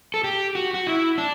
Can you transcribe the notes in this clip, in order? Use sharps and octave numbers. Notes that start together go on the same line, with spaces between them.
A4
G4
F#4
F#4
E4
D4